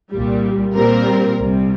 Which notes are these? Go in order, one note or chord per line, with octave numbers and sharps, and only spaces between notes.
C2 A#2 G3
A#2 G3 C4 A#4
C2 C3 G3